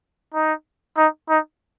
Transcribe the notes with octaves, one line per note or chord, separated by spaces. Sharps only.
D#4
D#4
D#4